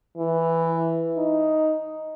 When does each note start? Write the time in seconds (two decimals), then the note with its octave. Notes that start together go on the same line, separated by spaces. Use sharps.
0.17 E3
1.18 D#4